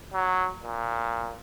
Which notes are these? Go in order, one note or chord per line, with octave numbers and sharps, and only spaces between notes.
F#3
A#2